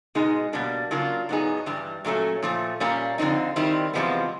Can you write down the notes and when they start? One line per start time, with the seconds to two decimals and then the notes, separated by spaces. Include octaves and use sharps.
0.15 B2 G#3 B3 D#4 G#4
0.53 B2 G3 A#3 D4
0.91 C#3 F#3 A#3 D4 F4
1.29 A2 F#3 B3 D#4 G#4
1.66 G2 E3 G3
2.05 A#2 F#3 A3 C#4
2.43 A#2 F3 A3
2.80 A#2 G3 A#3 C#4
3.18 F2 D3 G3 C4 D#4
3.56 D#3 G3 C4 E4
3.94 E2 C3 F3 G#3 B3